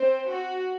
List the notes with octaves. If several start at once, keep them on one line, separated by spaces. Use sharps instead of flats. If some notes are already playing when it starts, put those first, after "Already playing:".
Already playing: C4 C5
F#4